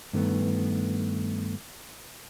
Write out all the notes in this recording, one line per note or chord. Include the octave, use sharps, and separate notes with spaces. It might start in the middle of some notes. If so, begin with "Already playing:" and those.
G2 D#3 A3 B3